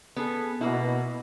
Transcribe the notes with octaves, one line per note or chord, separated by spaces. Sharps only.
B3 G#4 A4
B2 A#3 E4